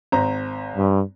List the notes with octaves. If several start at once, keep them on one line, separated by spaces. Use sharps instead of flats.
G#1 C5 A#5
G2